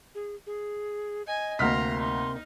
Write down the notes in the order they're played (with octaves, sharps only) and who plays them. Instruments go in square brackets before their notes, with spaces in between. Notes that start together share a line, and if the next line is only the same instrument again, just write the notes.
[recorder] G#4
G#4
[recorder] D#5 [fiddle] G#5
[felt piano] D2 F6 B6 [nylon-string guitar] C3 A#3 [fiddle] A#5 C6
[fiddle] D#4 [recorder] C6